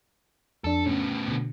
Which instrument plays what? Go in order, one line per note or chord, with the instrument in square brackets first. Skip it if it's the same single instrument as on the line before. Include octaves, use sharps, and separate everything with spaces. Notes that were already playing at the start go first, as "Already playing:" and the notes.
[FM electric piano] F2 D4 [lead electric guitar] A4
[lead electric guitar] A2 B3 [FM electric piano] C#4
[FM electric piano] B2 D3